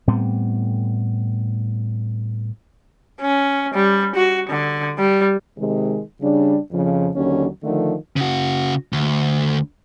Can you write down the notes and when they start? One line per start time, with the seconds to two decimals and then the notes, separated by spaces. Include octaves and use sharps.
0.07 A2 G3 B3 C4
3.21 C#4
3.74 G3
4.16 F#4
4.50 D3
4.98 G3
5.58 C3 D#3 G#3
6.22 C#3 G3 D4
6.72 F2 C#3 F3
7.15 D#2 D3 F#3 C#4
7.64 D3 D#3 F3 A3
8.16 C#3 F#4
8.93 D2